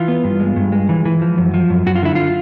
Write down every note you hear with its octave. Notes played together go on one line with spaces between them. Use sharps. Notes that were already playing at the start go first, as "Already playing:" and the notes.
Already playing: E3 F4
B3
G2
G#3
G2
G#3
E3
E3
F3
F#2
F3
F#2
F#2 F#4
F4
D3 E4
F4